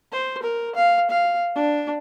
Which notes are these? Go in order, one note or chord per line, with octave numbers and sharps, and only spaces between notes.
C5
A#4
F5
F5
D4